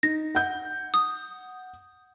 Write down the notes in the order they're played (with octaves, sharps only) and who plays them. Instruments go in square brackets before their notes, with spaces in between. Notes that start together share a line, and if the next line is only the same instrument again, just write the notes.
[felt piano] D#4 [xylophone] A#6
[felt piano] F#5 G6
[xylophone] D#6